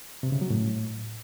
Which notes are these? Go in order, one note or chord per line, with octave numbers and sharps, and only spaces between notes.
C3
C#3
F#3
A2